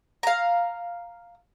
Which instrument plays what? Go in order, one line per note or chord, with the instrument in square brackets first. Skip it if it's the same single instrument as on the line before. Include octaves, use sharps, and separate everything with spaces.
[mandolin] F5 A#5